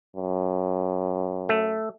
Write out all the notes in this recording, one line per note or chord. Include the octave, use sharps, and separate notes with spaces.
F#2
A3